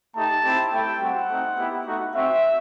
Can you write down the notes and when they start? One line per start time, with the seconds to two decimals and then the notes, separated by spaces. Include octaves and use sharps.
0.15 A3 D#4 G4 A5
0.43 C4 E4 G4
0.72 A3 E4 G4 G5
1.00 G3 C4 F#4 F#5
1.29 A3 C4 D#4
1.57 B3 E4 G4
1.86 A3 D#4 F#4
2.14 C4 F#4 E5